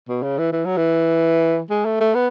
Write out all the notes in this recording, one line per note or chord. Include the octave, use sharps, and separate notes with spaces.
B2
C#3
E3
E3
F#3
E3
G#3
A3
A3
B3